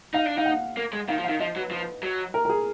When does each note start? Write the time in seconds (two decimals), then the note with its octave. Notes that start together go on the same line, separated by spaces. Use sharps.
0.14 D#4 F5
0.26 D4
0.38 D#4 F5
0.45 F#5
0.77 A#3
0.93 G#3
1.09 D#3 F5
1.19 F3
1.24 D#3 F5
1.40 F3 D#5
1.56 F#3 B4
1.71 F3 B4
2.03 F#3
2.34 A#4
2.45 A#4
2.49 G#4